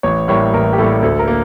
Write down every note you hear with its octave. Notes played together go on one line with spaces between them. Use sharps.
A1 C#5
A2 G3 A#3 C#5
A1 A#4
G4
A2 G3 A#3 A4
D2 A4
A#4
A#3